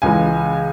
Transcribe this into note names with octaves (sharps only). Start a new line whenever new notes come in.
C#2 C#3 E3 G#3 G#5